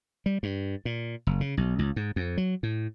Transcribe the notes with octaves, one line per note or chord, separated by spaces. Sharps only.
G3
G2
A#2
F#1
C#3
B1
C#2
G#2
F2
F#3
A2